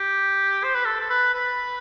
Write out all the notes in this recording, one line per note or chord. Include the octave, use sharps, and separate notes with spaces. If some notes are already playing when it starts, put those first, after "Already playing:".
Already playing: G4
C5
B4
A4
A4
B4
B4